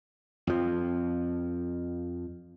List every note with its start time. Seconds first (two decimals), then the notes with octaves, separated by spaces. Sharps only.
0.47 F2 F3